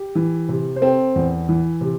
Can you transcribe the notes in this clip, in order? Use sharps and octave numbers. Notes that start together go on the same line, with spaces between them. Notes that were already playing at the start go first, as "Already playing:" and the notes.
Already playing: G4
E3
C3
C5
C4 A4
E2
E3
C3